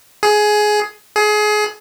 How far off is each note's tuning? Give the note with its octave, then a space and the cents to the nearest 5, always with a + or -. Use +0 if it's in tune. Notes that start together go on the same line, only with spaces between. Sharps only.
G#4 +15
G#4 +25